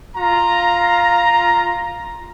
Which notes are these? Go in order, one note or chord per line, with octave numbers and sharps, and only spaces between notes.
F4 A#5